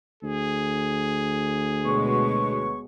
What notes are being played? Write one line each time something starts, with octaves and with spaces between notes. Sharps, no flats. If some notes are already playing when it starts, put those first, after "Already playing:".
D2 G#4
B2 G#3 B4 C#5 C#6